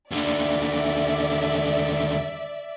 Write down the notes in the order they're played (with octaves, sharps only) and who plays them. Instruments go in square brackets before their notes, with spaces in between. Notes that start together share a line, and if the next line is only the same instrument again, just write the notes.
[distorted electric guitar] D#2 D3 [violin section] D5 E5